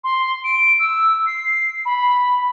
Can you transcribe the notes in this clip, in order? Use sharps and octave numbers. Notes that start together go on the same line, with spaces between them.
C6
D7
E6
C7
B5